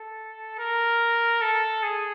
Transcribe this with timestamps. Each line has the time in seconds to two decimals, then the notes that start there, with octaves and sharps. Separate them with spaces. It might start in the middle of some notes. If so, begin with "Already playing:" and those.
Already playing: A4
0.59 A#4
1.41 A4
1.83 G#4